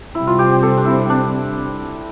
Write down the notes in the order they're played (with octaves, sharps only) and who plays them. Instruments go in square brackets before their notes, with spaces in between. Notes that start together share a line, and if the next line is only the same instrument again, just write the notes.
[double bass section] C3 G3 C4 [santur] E4
[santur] F4
G4
G4
A4
D4
E4
D4